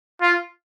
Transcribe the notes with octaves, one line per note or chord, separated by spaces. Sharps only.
F4